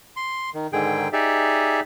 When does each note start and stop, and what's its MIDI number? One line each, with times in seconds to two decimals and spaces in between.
0.16 0.50 84
0.54 0.67 51
0.73 1.08 44
0.73 1.08 50
0.73 1.08 51
0.73 1.08 68
0.73 1.08 79
1.13 1.80 63
1.13 1.80 67
1.13 1.80 68
1.13 1.80 74
1.13 1.80 76